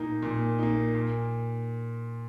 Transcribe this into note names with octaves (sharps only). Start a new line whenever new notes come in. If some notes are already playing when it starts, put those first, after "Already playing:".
Already playing: A#2 A#3 D#4
A#2
A#3 D#4
A#2